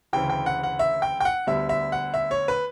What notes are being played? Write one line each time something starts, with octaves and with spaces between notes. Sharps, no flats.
D2 C#3 E3 G5
G5
F#5
F#5
E5
G5
G5
F#5
D2 D3 G3 B3 E5
E5
F#5
E5
C#5
B4